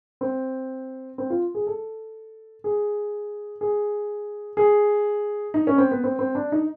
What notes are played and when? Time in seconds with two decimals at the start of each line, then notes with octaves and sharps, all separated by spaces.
0.21 C4
1.18 C4
1.30 F4
1.55 G#4
1.67 A4
2.64 G#4
3.61 G#4
4.57 G#4
5.54 D#4
5.67 C#4
5.78 C4
5.91 B3
6.04 C4
6.19 C4
6.35 D4
6.52 D#4